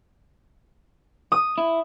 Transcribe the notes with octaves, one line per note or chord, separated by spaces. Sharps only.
D#6
E4